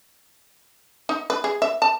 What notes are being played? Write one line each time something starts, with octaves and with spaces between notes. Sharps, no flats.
D#4
B4
G#4
E5
A5